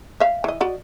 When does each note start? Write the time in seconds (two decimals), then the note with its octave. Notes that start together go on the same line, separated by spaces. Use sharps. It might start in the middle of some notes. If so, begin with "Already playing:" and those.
0.20 E5 F5
0.44 E3 D#5
0.61 F#4 D5 D#5